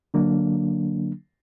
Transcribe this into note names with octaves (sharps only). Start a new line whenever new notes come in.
D3 F#3 A#3 D4